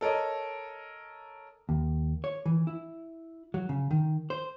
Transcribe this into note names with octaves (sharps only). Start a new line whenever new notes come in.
A4 A#4 C#5 D#5
D#2
C#5
E3
E4
F#3
C#3
D#3
C5